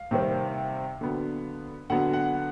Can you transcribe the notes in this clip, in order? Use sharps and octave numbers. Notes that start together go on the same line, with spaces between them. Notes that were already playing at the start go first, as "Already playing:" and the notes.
Already playing: F5
C3 D#3 G3 C4
D3 F#3 B3
D3 F#3 B3 F#5
F#5